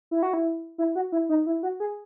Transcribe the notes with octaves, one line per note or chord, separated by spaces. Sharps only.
E4
F#4
E4
E4
F#4
E4
D#4
E4
F#4
G#4